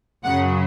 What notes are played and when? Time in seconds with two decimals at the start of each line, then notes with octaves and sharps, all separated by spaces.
0.24 F#2 C#3 F#3 F#5